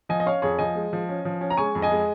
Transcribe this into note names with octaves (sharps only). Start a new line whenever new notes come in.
F3 D#5 G#5
D#5
C#4 C#5 F5
F2 G#4 C#5
F3 D#5 G#5
G#3
F3
C#4
F3
C#4
A#5
G#3 G#5 C#6
F2
D#5 G#5
G#3